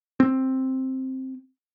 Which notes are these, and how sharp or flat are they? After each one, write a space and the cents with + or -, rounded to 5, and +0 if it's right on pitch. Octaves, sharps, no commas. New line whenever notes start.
C4 +5